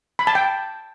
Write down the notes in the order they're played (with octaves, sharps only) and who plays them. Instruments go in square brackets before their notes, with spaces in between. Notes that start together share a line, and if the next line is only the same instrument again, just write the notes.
[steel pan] B5
A5
G5